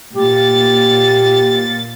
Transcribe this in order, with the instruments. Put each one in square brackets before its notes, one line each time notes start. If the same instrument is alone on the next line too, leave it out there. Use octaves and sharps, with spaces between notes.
[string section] A#2 A6 [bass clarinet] G4